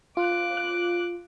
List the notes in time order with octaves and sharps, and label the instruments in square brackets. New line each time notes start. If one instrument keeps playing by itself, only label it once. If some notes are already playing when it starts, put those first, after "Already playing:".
[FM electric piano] F4 [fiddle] D6 F#6